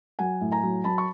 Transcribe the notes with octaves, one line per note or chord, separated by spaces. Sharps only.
F#3 F#5 G#5
A2
G#5 A#5
F#3
F#3 A5 B5
C#6